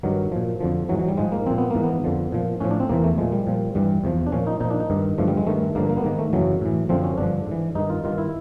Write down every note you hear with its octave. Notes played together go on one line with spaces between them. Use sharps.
G2 D#3 F#3
A#2 F3
F2 D3 F3
G#2 E3 F#3
F#3
G3
G#2 F3 G#3
A#3
A#2 F3 C4
B3
G#2 E3 A#3
B3
F2 D3 F3
A#2 F3
A2 F3 C#4
D4
C4
E2 C3 E3 A#3
A3
A#2 F3 G#3
G3
A#2 F3
G2 E3 G3
E2 C3 F3
D4
A#2 F3 C#4
D#4
A#2 F3 D#4
D4
D#4
G2 D#3
G2 D3 F3 A3
G3
G#3
G2 D#3 A3
G2 D3 F3 A#3
A#3
B3
G#2 D#3 A#3
A3
F#2 C#3 E3 F#3
A2 E3
F#2 D3 F3 C4
C#4
G2 D3 F3 D4
G#2 E3
G2 D#3 D#4
F4
G2 D#3 F4
E4